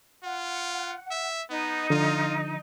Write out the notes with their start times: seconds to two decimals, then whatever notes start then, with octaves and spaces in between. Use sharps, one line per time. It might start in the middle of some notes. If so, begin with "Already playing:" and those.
0.23 F4 F#5
1.11 E5
1.50 B3 D#4
1.90 D3 F3 F4